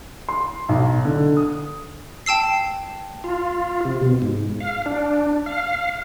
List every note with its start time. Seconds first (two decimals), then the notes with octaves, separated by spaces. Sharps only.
0.29 C6
0.69 B1
1.05 D3
1.37 D#6
2.26 G5 A5 E6 C7
3.24 F4
3.85 C3
4.02 B2
4.22 G#2
4.60 F5
4.86 D4
5.46 F5